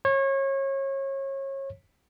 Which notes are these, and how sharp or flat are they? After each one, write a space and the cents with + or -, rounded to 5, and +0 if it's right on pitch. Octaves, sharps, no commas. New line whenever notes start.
C#5 -30